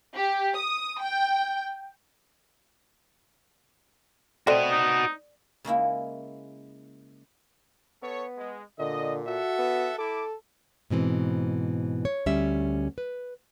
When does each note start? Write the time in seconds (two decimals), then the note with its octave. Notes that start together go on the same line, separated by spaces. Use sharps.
0.15 G4
0.57 D#6
1.01 G5
4.47 A3 C4 F#4 D5 D#5
4.71 D#4
5.65 C#3 G#3 A#3 E4
8.02 B3 A4 C#5
8.37 G#3
8.79 A#2 D3 D#5
9.27 F#4 A4 E5 F#5
9.58 B3
9.98 E4 A4 D6
10.90 G#2 B2 E3 C4
12.05 C#5
12.26 D2 G3 C#4 E5
12.98 B4